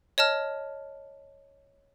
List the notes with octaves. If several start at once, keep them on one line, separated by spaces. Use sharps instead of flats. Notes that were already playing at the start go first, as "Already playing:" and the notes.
C#5 D#5 A5 F6